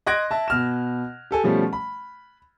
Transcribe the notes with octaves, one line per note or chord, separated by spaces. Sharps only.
D#5 C6 F#6 G#6 A#6 D7
E5 A5
B2 F6 E7
G4 A4 G#5
B2 F3 G3 A3 C#4
B5